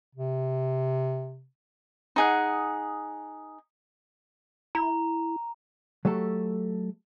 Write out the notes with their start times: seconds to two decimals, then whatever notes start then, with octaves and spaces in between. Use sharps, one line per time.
0.15 C3
2.16 D#4 G#4 F#5
4.75 E4 A#5
6.05 F#3 A3 G4 A4